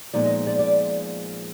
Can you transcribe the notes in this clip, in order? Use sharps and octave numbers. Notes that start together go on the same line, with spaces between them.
A#2 F3 G#3 B3 D#4 D5
D#5
D5
D5